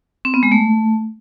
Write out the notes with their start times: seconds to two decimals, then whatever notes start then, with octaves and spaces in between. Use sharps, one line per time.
0.25 C4
0.34 B3
0.43 G#3
0.52 A3